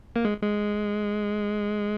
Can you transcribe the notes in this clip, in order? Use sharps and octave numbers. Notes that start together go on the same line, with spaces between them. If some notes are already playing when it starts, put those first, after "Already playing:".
A#3
G#3
G#3